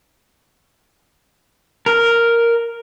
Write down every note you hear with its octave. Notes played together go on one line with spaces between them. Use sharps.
A#4